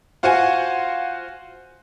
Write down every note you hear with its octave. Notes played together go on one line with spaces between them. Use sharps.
F4 F#4 C5 F5 F#5 G#5